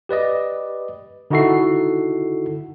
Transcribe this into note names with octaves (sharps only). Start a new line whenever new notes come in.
G4 B4 D5 D#5
D3 D#4 E4 F#4 A4 C7